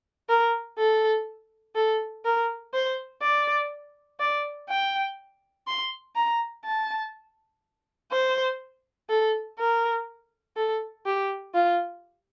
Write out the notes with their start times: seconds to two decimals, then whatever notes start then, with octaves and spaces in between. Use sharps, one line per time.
0.29 A#4
0.78 A4
1.75 A4
2.25 A#4
2.74 C5
3.22 D5
4.20 D5
4.69 G5
5.67 C6
6.15 A#5
6.65 A5
8.12 C5
9.10 A4
9.59 A#4
10.57 A4
11.06 G4
11.54 F4